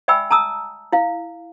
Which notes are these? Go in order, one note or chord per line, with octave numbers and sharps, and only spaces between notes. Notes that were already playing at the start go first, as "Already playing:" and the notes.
D5 E5 G5 G#5 B5 E6
A5 A#5 D#6 E6
E4 F5